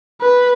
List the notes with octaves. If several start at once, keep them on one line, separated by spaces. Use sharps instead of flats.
B4